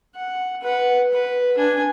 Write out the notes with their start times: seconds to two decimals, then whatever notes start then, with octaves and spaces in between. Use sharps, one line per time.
0.15 F#5
0.62 B4 F#5
1.12 B4
1.58 D4 G#5